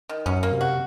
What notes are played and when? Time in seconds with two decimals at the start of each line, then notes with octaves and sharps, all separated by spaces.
0.09 D#3
0.26 F#2 C#4
0.43 A#3
0.52 C3
0.61 F#4